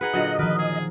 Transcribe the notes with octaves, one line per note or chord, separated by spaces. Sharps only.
D#4 G#4 B4 F#5
A#2 D3 F#3 D#5
D#3 F3 A#4 B4
G#4